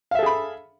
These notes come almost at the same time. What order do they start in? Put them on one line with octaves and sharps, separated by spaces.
F5 E5 A4 G#4 B5